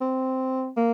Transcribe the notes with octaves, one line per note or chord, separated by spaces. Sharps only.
C4
A#3